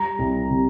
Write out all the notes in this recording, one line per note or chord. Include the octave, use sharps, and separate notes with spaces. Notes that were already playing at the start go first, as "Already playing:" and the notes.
Already playing: G3 A#5
C2
C3